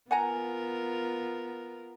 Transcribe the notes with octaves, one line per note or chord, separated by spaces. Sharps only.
B3 F4 A#4 F#5 G#5 A#5